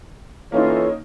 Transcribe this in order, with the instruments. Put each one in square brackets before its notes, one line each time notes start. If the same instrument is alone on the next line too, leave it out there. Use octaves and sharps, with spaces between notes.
[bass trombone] E3 [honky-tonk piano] A#3 C#4 D#4 [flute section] F4 A4 [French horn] C#5